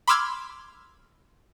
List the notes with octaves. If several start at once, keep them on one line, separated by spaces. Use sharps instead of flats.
B5 C6 D6 E6 F6 G#6